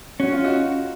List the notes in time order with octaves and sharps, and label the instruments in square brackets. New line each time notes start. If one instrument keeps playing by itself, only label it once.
[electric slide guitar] C#4 [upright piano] F#4
[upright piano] F4
D#4 F#4